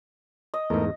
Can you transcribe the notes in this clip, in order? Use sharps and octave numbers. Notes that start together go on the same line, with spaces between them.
D#5
E2 G#2 A3 A#4